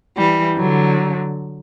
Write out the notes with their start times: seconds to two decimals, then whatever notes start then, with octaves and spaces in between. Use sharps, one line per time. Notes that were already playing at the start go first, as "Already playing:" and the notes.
0.17 E3 G3
0.58 D3 F#3